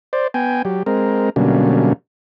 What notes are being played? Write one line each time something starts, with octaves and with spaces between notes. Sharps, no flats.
C5 D5
B3 G5 G#5
F#3 G4
G#3 C4 A#4
B2 D3 F#3 G3 A#3 C#4